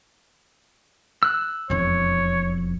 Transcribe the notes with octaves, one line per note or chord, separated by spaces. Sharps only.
E6 F#6
E1 F2 C#5